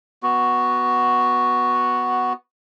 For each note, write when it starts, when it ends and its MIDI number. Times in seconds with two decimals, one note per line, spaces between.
0.23 2.33 59
0.23 2.33 66